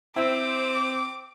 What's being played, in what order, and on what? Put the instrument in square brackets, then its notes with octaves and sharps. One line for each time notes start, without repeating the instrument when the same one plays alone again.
[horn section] C4 [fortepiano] E4 [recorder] C5 [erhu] D6